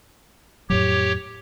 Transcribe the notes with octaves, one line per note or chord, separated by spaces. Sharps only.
F2 A2 F#3 G4 C#5